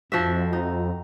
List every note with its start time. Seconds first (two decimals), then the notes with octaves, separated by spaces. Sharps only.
0.12 F2 F3 F#4 E5
0.53 D#4